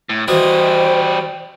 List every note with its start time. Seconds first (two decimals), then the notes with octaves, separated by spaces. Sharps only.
0.09 A2
0.28 E3 G3 F#4 C5 D#5